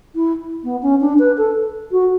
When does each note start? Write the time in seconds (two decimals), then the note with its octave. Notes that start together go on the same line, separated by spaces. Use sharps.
0.15 E4
0.64 B3
0.82 C#4
1.00 D4
1.19 B4
1.37 A4
1.91 F#4